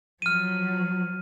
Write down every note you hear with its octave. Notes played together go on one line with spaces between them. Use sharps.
F3 F#3 F6 D#7